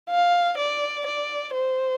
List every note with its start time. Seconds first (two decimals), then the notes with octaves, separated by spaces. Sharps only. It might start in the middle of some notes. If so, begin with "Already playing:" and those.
0.10 F5
0.58 D5
1.07 D5
1.54 C5